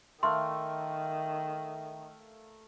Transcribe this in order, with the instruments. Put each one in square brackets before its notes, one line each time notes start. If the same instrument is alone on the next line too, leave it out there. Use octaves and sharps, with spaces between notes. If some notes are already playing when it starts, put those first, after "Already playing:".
[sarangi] D#3 [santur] A3 A#4 F5 [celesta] C6